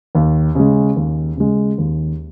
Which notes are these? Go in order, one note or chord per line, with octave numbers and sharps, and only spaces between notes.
D#2
C#3 G#3
D#2
C#3 G#3
D#2